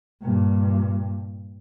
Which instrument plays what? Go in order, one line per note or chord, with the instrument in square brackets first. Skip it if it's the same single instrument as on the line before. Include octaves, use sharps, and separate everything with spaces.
[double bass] G2 A#2